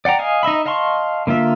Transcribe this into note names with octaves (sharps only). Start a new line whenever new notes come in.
D5 F#5 G5 A#5
D#5 F5 G#5
D#4 D#5 E5 B5
D#5 F5 A5 C6 C#6
D3 A#3 F4 E5